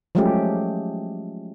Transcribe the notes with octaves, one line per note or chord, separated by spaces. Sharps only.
F3 F#3 G#3 A3 C#4 G4